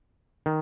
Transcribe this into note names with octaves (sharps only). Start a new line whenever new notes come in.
D#3